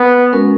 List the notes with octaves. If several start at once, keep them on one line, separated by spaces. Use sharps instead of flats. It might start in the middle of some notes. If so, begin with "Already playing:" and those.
Already playing: B3
G#3 C#4 F#4 A#4